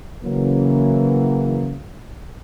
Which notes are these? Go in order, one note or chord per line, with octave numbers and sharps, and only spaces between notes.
C#3 E3 F#3 A#3